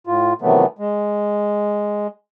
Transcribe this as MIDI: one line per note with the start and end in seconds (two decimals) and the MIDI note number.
0.07 0.34 45
0.07 0.34 65
0.42 0.66 48
0.42 0.66 51
0.42 0.66 52
0.42 0.66 54
0.42 0.66 57
0.42 0.66 59
0.79 2.07 56